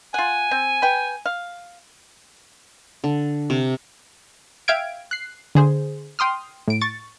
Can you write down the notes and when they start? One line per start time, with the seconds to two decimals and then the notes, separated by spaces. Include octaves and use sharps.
0.14 F4 F#5 G#5
0.51 C4
0.82 B4 G5
1.26 F5
3.04 D3
3.50 C3
4.68 E5 F5 G5 F6 G#6 D7
5.11 F#6 C7
5.55 D3 G#4 C5
6.19 G5 C6 D#6 F6
6.68 A2 D7
6.81 C#6 A6